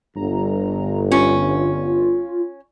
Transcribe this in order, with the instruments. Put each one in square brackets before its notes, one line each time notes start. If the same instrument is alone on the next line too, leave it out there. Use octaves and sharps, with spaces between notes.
[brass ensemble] G1 [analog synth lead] A#5
[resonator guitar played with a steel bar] C#4 [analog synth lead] F4